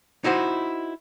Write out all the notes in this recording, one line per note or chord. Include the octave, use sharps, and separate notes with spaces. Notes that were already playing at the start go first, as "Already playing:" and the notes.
D#4 E4 F#4 C5